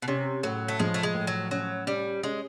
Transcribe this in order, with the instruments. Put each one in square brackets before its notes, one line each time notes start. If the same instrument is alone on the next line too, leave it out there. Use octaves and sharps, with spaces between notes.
[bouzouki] B2
[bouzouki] C3 [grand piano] C#4
[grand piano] A2 [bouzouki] F#3
[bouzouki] A3
[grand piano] F3 [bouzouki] G#3
[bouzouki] A3
G#3
[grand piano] A2
[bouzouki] F#3
[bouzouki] F#3 [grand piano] C#4
[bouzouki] G3 [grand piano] C#4
[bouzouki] G#3 [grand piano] C#4